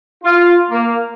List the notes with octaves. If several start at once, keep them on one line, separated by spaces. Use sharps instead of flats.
F4
A#3